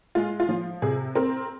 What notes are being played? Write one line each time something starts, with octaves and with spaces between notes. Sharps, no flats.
G#3 F4
F4
F3
C3 G#4
C4 A#4